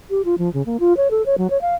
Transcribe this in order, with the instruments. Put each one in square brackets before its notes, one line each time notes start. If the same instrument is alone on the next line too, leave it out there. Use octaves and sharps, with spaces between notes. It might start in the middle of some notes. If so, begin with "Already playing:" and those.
[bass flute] G4
F4
F3
C#3
A#3
F4
C#5
A4
C#5
F#3
C#5
F5